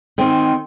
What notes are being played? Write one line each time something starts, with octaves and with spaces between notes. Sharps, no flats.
D#3 C4